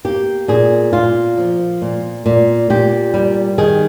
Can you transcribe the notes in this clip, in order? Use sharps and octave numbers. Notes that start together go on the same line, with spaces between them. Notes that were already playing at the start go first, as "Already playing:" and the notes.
A#3 G4
A#2 G#4
A#2 F4
F3
A#2
A#2
A#2 G4
G3
D#3 G#4